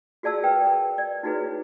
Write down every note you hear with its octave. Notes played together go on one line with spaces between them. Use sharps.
F#4 G#4 D5 A5 E6
A#4 B4 G5
A#4
D5
D#4 E4 F#4 G#4 B4 C#5